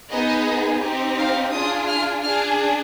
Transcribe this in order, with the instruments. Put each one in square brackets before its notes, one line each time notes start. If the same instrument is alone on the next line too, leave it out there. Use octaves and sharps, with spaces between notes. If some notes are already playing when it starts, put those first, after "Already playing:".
[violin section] B3 D#4 G#4 D#5
C4 D#4 G4
F5
D4 F4 G#4 D#6
F6
D4 G#4 F6